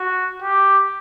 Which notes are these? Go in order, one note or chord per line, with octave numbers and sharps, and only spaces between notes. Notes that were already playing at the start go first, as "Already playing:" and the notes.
Already playing: F#4
G4